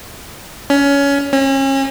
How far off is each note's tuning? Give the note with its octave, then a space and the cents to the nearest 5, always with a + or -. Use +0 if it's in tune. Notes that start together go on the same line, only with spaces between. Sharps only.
C#4 +20
C#4 -35